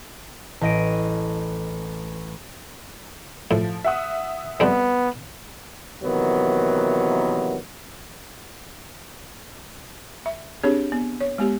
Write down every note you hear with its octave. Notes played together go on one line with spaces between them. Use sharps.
A1 D#5 D7
A2 F3
E5 F#5 D#6
F2 G3 B3 D4
C3 D#3 E3 F#3 A#3 B3
E5
C4 D4 G4 G#4 C#5
B3
C#5
G#3 B3 G4